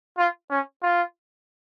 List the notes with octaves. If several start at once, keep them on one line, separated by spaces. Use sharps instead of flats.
F4
C#4
F4